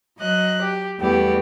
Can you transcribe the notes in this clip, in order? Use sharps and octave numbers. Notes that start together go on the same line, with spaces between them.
F#3 D#5 F#6
G4
E2 G3 A3 B3 G4